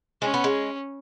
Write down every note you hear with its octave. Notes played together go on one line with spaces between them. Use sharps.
G#3 C#4
B3
G#3